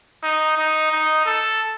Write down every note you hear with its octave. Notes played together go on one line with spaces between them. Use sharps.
D#4
D#4
D#4
A4